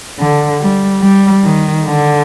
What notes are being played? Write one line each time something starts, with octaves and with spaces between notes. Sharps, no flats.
D3
G3
G3
D#3
D3